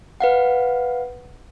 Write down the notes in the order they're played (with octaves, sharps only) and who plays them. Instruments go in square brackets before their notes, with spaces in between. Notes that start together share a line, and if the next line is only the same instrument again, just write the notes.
[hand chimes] B4 F5 F#5